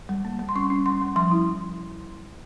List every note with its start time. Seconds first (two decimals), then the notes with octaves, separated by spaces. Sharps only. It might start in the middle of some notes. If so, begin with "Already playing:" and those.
0.09 G3
0.25 A#3
0.39 G3
0.49 C6
0.56 C#4 C#6
0.70 C#4
0.86 G3 C6
1.02 G3
1.16 F3 C6
1.31 E4